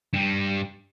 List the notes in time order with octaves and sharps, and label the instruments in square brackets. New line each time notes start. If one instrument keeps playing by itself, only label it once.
[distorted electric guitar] G2 G3